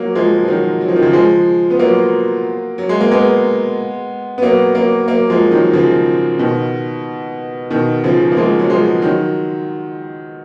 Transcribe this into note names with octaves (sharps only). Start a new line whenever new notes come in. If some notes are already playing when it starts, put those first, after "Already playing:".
Already playing: F#3 A#3
F3 G#3
F3
D#3 F#3
F#3
F3
D#3
C#3 F3
F3 G#3
B3
F#3 A#3
F#3
G#3
A#3
G#3 B3
B3
F#3 A#3
F#3 A#3
F#3 A#3
F3 G#3
D#3 F#3
C#3 F3
B2 D#3
B2 D#3
C#3 F3
A#3
F3 G#3
F#3
F3 G#3
D#3 F#3